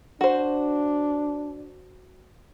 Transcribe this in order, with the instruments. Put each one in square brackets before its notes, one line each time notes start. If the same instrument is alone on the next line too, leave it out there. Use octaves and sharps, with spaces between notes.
[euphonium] D4 [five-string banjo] F#4 C5